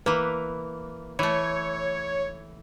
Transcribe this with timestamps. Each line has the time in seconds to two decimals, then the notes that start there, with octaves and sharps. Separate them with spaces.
0.06 E3 A#3 B4
1.19 E3 A3 C#5